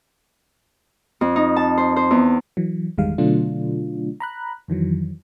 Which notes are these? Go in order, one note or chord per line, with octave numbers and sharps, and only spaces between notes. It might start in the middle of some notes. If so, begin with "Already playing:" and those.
F2
D#4
A5
C5
C5
E2
E3 F#3
G1 E2 D#3 G3 G#3 F5
B2 D3 F#3 A3 D4 F4
A#5 B5 F#6
F2 D#3 E3 F#3